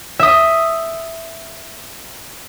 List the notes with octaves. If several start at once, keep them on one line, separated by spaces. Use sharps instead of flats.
E5 D#6